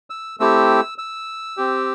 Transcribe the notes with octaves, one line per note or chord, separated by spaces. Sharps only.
E6
A3 C4 E4 G4 E6
E6
C4 G4